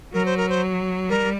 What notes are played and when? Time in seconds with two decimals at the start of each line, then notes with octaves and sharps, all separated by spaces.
0.14 F#3 A#4
0.26 C5
0.37 A#4
0.49 C5
1.09 G3 A#4